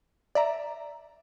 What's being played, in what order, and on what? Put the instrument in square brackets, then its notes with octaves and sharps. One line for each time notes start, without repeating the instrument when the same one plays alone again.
[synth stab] D5 E5 A#5